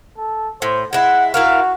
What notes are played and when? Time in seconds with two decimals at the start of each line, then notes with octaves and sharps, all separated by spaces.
0.18 A4
0.62 A2 C5
0.93 G#3 E4 F#5
1.34 E4 F#4 A#4 F5